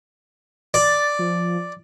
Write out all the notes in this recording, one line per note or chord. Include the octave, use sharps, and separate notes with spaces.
D5 A6
F3